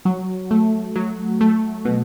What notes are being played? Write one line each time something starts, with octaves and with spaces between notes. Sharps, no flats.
F#3
A3
F#3
A3
B2